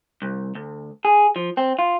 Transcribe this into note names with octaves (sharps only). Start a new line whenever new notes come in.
C2
D2
G#4
F3
C4
F4